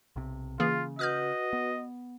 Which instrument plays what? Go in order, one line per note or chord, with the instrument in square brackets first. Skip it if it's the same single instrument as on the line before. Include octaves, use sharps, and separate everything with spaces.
[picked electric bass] B1 C3
[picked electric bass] C#3 [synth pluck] E3 A#3 G#4 [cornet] F4
[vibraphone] F#4 B4 F#5 [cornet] D#5 [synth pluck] D#6 F6 G6
[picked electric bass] B3